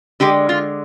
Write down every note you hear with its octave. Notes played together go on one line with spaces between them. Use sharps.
D3 G#3 G4
F4